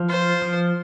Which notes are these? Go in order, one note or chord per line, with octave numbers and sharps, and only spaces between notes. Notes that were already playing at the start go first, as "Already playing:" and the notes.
Already playing: F3
F4 C5
F3